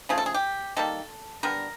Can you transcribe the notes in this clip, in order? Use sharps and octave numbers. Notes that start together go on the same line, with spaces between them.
C#3 F3 A3 G#4
A4
G#4
G4
D#3 G3 A#3 A4
D3 G3 B3 A#4